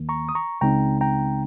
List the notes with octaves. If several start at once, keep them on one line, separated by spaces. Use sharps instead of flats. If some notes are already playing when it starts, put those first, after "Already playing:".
Already playing: D#2 D#3 A#3
A#5 C#6
D#6
A#5 C#6
C#2 C#3 G#3 C4 D#4 G5 A#5
G5 A#5